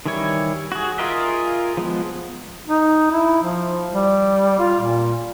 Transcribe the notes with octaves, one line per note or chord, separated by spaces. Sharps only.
D#3 E3 G3 E4 C#5
F#4 G#4
F4 G#4 A#4 D#5 E5
F3 G#3 B3
D#4
E4
F3
G3
F4
A#2